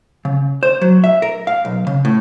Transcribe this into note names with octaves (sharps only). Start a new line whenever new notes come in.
C#3
C5
F#3
E5
A#4
F5
B1
C#3
A2